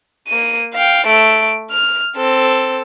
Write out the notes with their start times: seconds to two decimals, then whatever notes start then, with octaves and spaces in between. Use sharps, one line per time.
0.28 A#3 D#7
0.74 F5 G5
1.06 A3 D7
1.71 F6
2.17 C4 A4